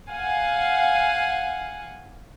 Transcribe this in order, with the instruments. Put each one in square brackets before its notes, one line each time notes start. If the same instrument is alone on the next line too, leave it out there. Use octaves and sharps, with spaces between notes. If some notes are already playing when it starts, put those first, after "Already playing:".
[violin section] F5 F#5 G#5